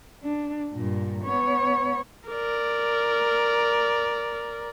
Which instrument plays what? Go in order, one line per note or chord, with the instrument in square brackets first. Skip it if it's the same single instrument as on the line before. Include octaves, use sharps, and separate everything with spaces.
[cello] D4
G2 A#2
B3 C#5
[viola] A#4 D5